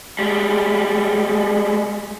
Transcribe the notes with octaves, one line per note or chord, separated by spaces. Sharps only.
G3 G#3